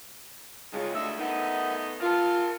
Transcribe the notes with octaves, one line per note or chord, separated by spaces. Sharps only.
G2 C#3 G#3 F4
A3 D4 D#5 E5
A3 B3 D#4 A#4 F#5
F4 A#4 A5